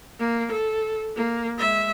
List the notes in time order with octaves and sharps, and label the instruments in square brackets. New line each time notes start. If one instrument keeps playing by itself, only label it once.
[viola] A#3
A4
A#3
G#3 E5